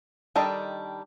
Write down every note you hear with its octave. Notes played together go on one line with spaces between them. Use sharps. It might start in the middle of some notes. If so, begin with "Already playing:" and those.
D#3 G3 D4 A4 D#5